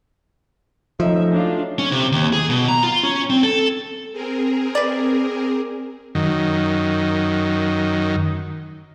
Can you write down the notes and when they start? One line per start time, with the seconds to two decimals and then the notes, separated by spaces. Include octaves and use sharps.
1.00 F3 A3 C#4 D#4 E5
1.32 F#3 D4 F4
1.79 C#4
1.92 C3
2.12 D#2
2.33 G#4
2.50 B2
2.68 A#5
2.84 F4
3.03 C#4
3.30 C4
3.44 A4
4.13 C4 G#4 A#4
4.75 B4 D5
6.15 F#2 D#3